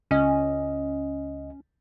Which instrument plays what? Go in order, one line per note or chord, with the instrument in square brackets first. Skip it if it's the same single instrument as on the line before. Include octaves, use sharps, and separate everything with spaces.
[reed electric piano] C#2 D#5 [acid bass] C#4